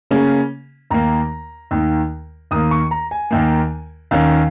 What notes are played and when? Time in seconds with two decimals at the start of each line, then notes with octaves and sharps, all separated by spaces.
0.11 C#3 A#3 C#4
0.91 D#2 D#3 A#3 A#5
1.71 D#2 D#3 A#3
2.51 D#2 D#3 A#3 D#6
2.71 C#6
2.91 A#5
3.11 G#5
3.31 D#2 D#3 A#3
4.11 D#2 D#3 C#4 F5